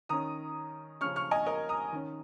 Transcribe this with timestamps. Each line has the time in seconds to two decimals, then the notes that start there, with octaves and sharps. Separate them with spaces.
0.09 D#3 C#4 A#5 D#6
1.01 C#3 F3 C#4 C#6 F6
1.16 C#6 F6
1.31 D#5 G#5
1.46 A#4 D#5
1.69 A#5 D#6
1.92 D#3 C#4